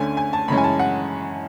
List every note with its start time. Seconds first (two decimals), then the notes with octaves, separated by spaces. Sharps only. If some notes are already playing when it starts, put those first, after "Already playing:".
Already playing: D2 D3 A3 C#4 G#5
0.17 G#5
0.33 A5
0.48 F#2 C#3 E3 G#3 C#4 B5
0.57 G#5
0.64 A5
0.79 F#5